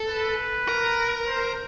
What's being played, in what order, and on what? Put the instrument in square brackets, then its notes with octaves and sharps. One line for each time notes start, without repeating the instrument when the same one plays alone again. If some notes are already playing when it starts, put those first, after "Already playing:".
Already playing: [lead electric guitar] A4
[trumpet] B4
[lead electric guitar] A#4
[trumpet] C5